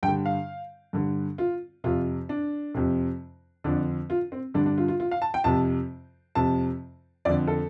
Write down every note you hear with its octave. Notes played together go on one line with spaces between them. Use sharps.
G2 G5
D3
F5
G2 D3
F4
F2 C3 F4
D4
F2 C3
F2 D3 D4
F4
C4
G2 D3 D4
D4
F4
F4
F4
F5
A5
G5
F2 C3 A5
F2 C3 A5
F2 D3 D5
A4